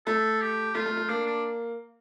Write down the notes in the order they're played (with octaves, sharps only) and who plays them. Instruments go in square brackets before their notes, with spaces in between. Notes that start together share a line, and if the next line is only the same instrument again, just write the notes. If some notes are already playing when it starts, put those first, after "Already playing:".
[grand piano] A3 [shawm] A4
[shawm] G4
[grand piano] A3 [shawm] F4
[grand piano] A3
A3
[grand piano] A#3 [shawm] D4
[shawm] D4